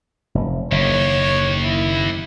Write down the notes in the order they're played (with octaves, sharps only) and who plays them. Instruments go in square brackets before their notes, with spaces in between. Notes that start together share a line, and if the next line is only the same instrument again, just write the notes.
[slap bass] F1
[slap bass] F#1 [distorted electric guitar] D#2 [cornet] C#5
[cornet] E4